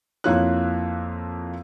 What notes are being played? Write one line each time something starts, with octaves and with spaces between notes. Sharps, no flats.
F2 A#3 E4 F4 C#5 F#6